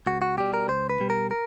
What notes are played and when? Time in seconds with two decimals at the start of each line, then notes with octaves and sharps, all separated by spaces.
0.06 C#2 F#4
0.22 F#4
0.37 B2 G3 G4
0.54 A#4
0.68 C#2 C5
0.89 B4
1.00 B2 G3
1.10 A#4
1.31 A#4